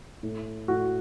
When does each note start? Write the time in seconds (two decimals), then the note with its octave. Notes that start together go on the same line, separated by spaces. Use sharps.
0.23 A2
0.68 A2 F#4